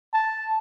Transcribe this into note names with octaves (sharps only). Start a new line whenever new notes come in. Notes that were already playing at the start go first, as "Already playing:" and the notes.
A5